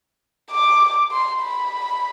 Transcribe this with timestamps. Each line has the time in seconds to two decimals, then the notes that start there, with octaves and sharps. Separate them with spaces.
0.51 D6
1.12 C6
1.41 B5